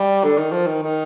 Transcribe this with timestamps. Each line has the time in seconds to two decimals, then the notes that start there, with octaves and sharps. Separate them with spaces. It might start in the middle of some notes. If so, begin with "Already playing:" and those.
Already playing: G3
0.24 D3
0.37 D#3
0.52 F3
0.67 D#3
0.82 D#3